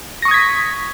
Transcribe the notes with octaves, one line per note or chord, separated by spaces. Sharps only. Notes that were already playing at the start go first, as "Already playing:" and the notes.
C#6 D#6 G#6 A#6 B6